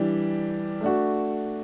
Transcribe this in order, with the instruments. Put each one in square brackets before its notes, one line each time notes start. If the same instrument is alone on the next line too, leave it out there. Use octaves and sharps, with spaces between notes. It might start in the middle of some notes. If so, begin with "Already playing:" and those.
Already playing: [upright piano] E3 G3 D4 G4
A3 D4 F#4